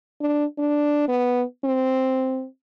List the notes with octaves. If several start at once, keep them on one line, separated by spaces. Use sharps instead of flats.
D4
D4
B3
C4